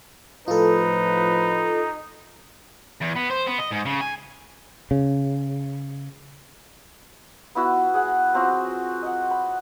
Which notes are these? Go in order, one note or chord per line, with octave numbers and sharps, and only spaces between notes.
A2 F3 D#4 F4 A4 B4
E2
B3
C5
B3
D#5
G#2
C#3
G#5
C#3
B3 E4 F#4
G#4 F#5
F#3 C4 F4 F#4
D#5 F#5
B5